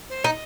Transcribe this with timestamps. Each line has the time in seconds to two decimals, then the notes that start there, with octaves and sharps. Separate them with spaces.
0.09 C5
0.24 D#4 D#5